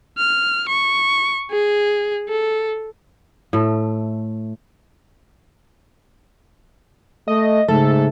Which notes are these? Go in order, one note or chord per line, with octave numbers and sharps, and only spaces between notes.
F6
C#6
G#4
A4
A2 A3
A3 D#5
G#2 C#3 A3 A4